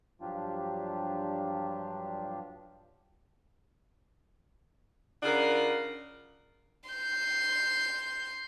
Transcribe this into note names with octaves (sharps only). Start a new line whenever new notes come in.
G2 F3 F#3 D4 F4 G4
C#3 D4 F4 A#4 F#5
C6 G6